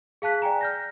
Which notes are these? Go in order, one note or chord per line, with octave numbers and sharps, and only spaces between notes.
G#4 F5 A5 F#6 B6
D5 G5 G#5 A#5
F6 G6 A#6